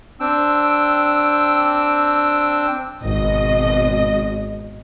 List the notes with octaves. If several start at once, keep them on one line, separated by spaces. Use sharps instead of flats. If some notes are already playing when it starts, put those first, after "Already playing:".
C4 D4 G5 E6
G#1 B2 D#5